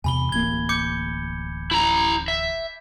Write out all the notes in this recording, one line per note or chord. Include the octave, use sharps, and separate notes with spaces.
E2 C3 G#5 B5 G7
D1 A1 A#3 G#6 G7
D6 G6 C#7
E4 A#5
E5